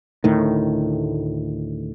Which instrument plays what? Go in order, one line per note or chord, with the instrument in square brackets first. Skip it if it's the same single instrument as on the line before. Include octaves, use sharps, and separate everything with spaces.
[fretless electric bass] D2 A2 D#3